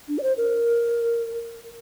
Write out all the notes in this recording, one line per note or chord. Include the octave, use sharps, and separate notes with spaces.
D4
D5
C5
A#4